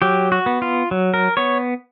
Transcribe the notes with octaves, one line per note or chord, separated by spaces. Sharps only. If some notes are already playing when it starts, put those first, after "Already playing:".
F#3 G4
F#4
B3
F4
F#3
A#4
B3 C#5